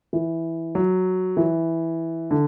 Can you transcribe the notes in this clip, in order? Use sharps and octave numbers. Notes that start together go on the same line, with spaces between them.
E3
F#3
E3
D3